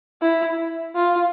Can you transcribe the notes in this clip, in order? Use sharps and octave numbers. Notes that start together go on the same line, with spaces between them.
E4
F4